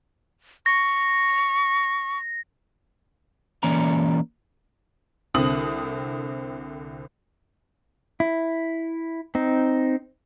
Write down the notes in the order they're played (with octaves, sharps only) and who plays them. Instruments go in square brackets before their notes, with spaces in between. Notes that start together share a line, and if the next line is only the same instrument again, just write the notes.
[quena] C#6 [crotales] A#6
[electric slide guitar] E3 A#3 C#4 D5 A#5
[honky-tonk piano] C2 D3 C4 D#6 F#7
[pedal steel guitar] E4
C4 D#4